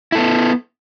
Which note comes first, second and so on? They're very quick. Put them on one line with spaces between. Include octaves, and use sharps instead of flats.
E4 A4 B3